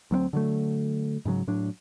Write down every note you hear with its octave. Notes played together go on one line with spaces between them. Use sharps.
D2 F#3 A#3 C4
D3 F#3 A3
G#2 C#3 F3 F#3
A2 F#3 D4